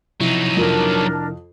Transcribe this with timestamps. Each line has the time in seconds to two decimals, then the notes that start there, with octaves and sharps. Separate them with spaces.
0.21 C3 F3 F#3 D#4 E4
0.57 F2 D4 A#4